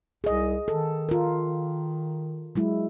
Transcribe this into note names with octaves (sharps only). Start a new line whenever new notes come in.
C2 G#4 D#5
D#3 A4
F4 A#4
F#3 G#3 E4